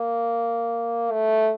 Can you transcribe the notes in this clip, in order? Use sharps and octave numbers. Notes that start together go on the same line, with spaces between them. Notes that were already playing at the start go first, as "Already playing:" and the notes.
Already playing: A#3
A3